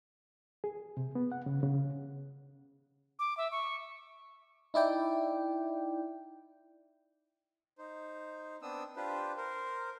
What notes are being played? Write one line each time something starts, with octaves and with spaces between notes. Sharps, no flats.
G#4
C3
B3
F#5
C#3
C#3
D6
E5
C#6
D#4 E4 D5 G5
D#4 C5
B3 C4 D4 D#6 E6
D4 F4 G4 B4 C5
A#4 C5